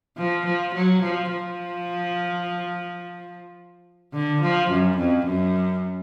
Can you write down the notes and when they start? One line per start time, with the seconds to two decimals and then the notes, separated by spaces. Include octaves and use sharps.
0.17 F3
0.46 F3
0.74 F#3
1.02 F3
1.31 F3
4.14 D3
4.42 F3
4.71 F#2
4.98 F2
5.26 F#2